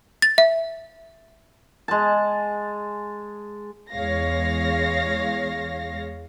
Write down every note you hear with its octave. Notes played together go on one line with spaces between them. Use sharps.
A6
E5
G#3 A5
E2 G#3 C#5 F5 A#6